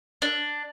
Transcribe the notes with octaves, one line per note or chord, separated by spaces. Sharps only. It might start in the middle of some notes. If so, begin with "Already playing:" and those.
D4